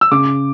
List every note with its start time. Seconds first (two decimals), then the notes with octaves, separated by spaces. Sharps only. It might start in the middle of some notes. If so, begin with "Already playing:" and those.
0.01 E6
0.11 C#3 D6